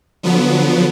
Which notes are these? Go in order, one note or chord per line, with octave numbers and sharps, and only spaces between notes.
D3 F3 F#3 B3